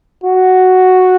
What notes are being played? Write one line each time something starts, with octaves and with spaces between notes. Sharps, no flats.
F#4